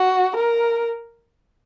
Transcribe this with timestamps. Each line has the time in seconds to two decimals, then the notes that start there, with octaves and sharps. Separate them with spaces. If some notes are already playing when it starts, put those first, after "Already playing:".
Already playing: F#4
0.36 A#4